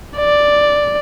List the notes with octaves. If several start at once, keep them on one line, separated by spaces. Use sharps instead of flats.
D5